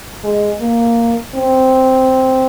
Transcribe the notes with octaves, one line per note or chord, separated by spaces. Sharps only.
G#3
A#3
C4